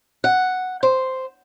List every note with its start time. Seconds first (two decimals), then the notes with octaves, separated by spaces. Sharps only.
0.24 F#5
0.83 C5